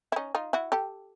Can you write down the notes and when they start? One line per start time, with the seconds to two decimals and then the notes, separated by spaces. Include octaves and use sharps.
0.12 E4
0.16 C#4 D#4
0.35 D#4 F4
0.53 E4 F#4
0.72 G4 A4